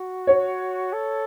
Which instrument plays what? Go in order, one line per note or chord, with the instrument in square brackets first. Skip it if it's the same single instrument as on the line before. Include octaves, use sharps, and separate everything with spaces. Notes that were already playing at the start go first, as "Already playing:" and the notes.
Already playing: [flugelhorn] F#4
[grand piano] C#5
[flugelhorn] A4